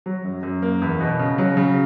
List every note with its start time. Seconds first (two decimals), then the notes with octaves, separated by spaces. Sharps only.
0.06 F#3
0.24 F#2
0.43 F#2
0.62 A#3
0.82 E2
1.00 B2
1.19 C#3
1.38 F#3
1.57 C#3